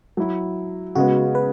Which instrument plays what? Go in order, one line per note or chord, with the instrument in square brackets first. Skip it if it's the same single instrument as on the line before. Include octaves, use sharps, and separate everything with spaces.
[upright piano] F#3 E4
[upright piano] C#3 G#3 B3 [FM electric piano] F#4
[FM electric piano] B4